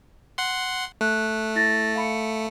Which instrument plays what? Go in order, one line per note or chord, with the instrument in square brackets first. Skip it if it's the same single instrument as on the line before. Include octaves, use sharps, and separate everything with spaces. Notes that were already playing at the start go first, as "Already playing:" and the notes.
[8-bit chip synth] F#5 C6
[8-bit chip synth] A3 [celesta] F#6
[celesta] E4 A6 A#6
F5 B5 C#7